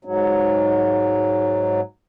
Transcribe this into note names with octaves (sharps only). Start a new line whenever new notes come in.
G#2 F#3